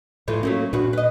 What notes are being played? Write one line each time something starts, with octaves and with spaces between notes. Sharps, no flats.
A2 E3 F3 A3
F#3 A3 A#3 C#4
E2 A#2 D4 F#4 B4
B4 D#5